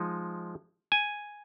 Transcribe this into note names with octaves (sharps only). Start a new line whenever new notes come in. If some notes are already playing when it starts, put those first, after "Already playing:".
Already playing: F3 G#3 D#4
G#5